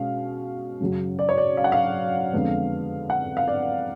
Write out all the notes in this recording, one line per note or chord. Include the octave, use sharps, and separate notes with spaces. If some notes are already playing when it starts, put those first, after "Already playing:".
Already playing: B2 G#3 C#4 F5
F#2 C#3 F#3
D5
C#5
D5
F5
F#5
F5
F2 D3 G#3 B3
F#5
F5
D5